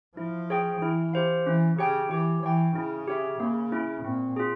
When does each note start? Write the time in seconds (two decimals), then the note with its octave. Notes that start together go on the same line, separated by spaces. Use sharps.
0.17 F3 E4
0.50 G#4 C#5 G5
0.82 E3 E4
1.14 G4 C5 F5
1.46 E3 C#4
1.78 C#3 G4 C#5 G5
2.11 E3 G4
2.43 E3 C#5 G5
2.76 C#3 E4
3.08 G4 C#5 E5
3.39 C#3 A#3
3.72 C#4 E4
4.04 A#2 C4
4.36 F4 G#4